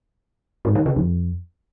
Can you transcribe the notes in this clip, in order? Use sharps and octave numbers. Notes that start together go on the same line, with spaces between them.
G#2
D#3
C#3
F2